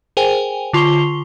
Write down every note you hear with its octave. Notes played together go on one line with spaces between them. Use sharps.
G#4 A#4 C5 G5 G#5
D3 F4 C6 C#6 C7 G7